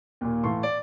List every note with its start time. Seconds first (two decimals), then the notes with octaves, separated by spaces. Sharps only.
0.21 D#2 A#2
0.44 A2 E3 F5 A5 C6 C#6
0.63 D5